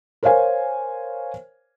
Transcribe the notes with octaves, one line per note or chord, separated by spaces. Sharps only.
A#4 C5 C#5 F5 G#5